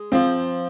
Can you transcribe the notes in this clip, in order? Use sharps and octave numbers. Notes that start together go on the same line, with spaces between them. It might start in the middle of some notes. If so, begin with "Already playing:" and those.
Already playing: G#3
F3 C4